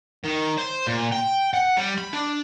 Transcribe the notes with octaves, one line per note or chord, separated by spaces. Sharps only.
D#3
C5
A#2
G5
F#5
G3
B5
D4